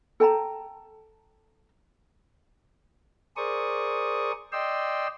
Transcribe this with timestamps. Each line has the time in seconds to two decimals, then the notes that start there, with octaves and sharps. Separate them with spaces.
0.20 A4 G5 A5 A#5
3.37 G#4 A#4 C5 D5 C#6 D#6
4.52 D5 D#5 G5 C6 E6